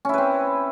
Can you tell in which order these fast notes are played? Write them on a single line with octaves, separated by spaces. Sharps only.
C#4 E4 B4 C4